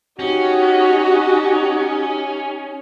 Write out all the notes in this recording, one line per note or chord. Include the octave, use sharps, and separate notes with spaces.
C#4 D#4 F#4 G4